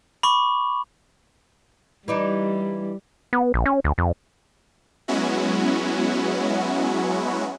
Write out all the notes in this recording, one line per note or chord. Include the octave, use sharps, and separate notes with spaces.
B5 C#6 D6
E3 G3 D4 D#4
B3
A#1
C#4
D2
F2
F#3 G#3 B3 C#4 E4 F#4